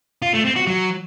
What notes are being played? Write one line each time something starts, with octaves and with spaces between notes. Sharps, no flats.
F4
A3
C4
F#4
F#3